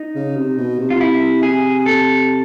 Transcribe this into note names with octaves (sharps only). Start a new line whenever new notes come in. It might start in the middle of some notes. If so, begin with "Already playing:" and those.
Already playing: D#4
C#3
C3
B2
C3
F4
E4
G#4
A4